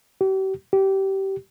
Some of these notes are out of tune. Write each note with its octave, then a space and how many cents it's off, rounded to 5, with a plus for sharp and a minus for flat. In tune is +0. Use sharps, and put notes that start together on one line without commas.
G4 -40
G4 -20